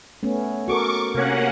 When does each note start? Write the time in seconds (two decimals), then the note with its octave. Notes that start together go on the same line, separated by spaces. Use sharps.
0.23 A3 B3 C#4
0.68 F#4 A4 A#4 C#6 D6
1.15 C3 A#3 C#4 F#5